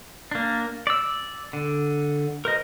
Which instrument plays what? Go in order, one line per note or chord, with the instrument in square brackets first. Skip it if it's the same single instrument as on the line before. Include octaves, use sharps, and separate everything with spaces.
[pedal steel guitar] A#3 D4
D5 E6
D3
A#4 C5 D#5